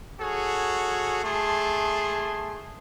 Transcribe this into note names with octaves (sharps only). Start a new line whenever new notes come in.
F#4 G#4 A4 C#5
A3 G#4 A5 C6